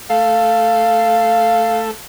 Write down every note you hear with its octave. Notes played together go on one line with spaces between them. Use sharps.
A3 A4 F5